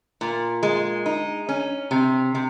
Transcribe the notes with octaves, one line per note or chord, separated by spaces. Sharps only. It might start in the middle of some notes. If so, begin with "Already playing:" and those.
A#2
G#3
D#4
C#4
C3
C3